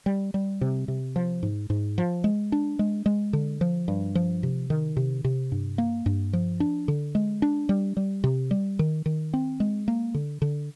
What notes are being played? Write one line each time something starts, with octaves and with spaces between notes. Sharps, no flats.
G3
G3
C3
C3
F3
G#2
G#2
F3
G#3
D4
G#3
G#3
D3
F3
G2
F3
C3
D#3
C3
C3
G2
A#3
G2
F3
D4
D3
G#3
D4
G3
G3
C3
G3
D#3
D#3
C4
G#3
A#3
D3
D3